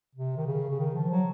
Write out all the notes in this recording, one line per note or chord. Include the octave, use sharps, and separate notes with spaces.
C3
D#3
C#3
C#3
D#3
F3
F#3